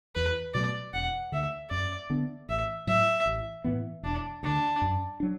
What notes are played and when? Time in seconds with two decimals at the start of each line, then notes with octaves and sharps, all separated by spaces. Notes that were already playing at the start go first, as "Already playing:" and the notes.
0.15 E2 B4
0.54 B2 F#3 A3 D5
0.93 E1 F#5
1.32 D2 D3 E5
1.70 F#2 D5
2.10 D3 B3 D4
2.49 A1 E5
2.87 A2 F#3 E5
3.26 A1
3.64 A2 E3 B3
4.03 E1 D4
4.43 D2 D3 D4
4.82 F#2
5.20 F#3 D4